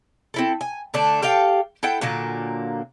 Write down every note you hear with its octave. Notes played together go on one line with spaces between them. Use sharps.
C4 E4 A4
G#5
D3 A3 D4
G4 A4 F5 G5
E4 A4 F#5 G5
A#2 D3 F#3 A#3